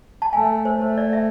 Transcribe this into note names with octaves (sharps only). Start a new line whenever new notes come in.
A5
A3 G#5
C5
A3 C5
D5
E5